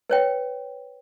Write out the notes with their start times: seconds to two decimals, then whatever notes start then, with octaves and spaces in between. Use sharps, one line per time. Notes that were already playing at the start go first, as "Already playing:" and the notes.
0.10 B4 C#5 G5